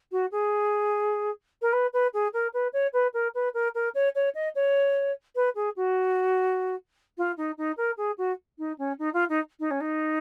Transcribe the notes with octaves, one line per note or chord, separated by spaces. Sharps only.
F#4
G#4
A#4
B4
B4
G#4
A#4
B4
C#5
B4
A#4
B4
A#4
A#4
C#5
C#5
D#5
C#5
B4
G#4
F#4
F4
D#4
D#4
A#4
G#4
F#4
D#4
C#4
D#4
F4
D#4
D#4
C#4
D#4